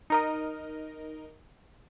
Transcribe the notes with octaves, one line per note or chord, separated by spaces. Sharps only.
D#4 A#4 D#5